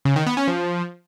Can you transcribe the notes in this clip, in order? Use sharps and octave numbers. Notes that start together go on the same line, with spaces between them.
C#3
D#3
B3
C#4
F3